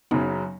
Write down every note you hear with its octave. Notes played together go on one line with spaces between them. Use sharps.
F#1 F#2 C#3 F#3 B3 D#4